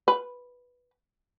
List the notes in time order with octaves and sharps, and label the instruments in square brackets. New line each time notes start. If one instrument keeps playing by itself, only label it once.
[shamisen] B4